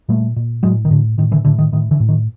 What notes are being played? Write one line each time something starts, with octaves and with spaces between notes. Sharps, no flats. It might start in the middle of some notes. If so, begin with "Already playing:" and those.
A#2 G3 A3
A#2
A2 F#3 G#3
D#3
A2 D3
A2 D#3
D3 E3
A2 D3
D#3
A2 D#3
D3 E3
A2
D#3